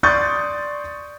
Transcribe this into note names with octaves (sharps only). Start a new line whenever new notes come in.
D5 C6 C#6 D#6 G6 A6